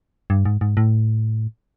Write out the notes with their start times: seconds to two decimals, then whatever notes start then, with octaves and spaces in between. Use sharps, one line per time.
0.30 G2
0.45 G#2
0.61 G#2
0.77 A2